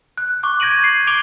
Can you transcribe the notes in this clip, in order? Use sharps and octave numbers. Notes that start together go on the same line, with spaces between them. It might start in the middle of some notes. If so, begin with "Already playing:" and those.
F#6
C#6 D6 F#6
G6 G#6 A#6 D7 D#7 F#7
C7
D6 D7 F7 G7